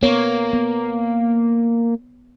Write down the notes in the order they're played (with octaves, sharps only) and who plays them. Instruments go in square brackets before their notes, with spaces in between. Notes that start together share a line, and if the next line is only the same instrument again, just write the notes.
[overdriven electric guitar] A#3 [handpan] B3 C#5
[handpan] B3